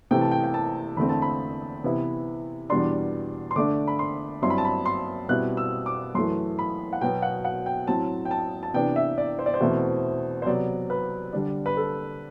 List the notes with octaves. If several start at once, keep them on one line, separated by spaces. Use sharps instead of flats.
C3 E3 A3 G5
A5
G5
G5
A5
E2 D3 A3 C4 B5
A5
B5
C3 E3 B3 E4
E2 B2 G3 D4 C6
C6
D3 A3 D4 D6
B5
C6
G2 F#3 C4 E4 C6
B5
A5
B5
C6
B2 G3 C4 E4 F#6
E6
D6
F#2 E3 A3 C6
B5
F#5
B2 F#3 B3 G5
F#5
F#5
G5
A2 F#3 C4 A5
G5
A5
A5
C3 E3 B3 D4 G5
E5
D5
C5
D5
C5
E2 B2 A3 C4 E4
C5
C3 F#3 B3 D5
B4
D3 G3 D4
B4
A4